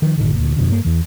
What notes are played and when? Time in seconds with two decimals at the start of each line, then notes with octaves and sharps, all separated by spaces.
0.02 D#3 F3
0.17 F#1 A2 D3 D#3
0.35 D2 A#2
0.56 F2 B2 D3
0.69 G2 A#3
0.85 E2 E3